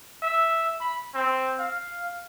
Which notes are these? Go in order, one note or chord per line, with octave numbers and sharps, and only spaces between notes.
E5
B5
C4
F5